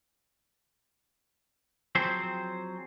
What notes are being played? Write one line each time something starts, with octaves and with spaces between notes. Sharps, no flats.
F3 F#3 C4 G#4 C5